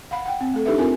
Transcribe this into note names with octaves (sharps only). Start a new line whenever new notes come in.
F5 F#5 B5
F#5 G5
C4
A3 A4
D4 D#4 G4 A4 B4 E5
C4 F4 A#4 G#5